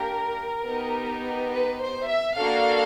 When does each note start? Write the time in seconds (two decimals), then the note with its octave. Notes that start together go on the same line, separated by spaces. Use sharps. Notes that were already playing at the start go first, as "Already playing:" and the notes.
Already playing: A#3 D4 G4 A#4
0.69 B3 D#4 G4
1.53 B4
1.82 C5
2.10 E5
2.39 A#3 D4 F#4 A4 F5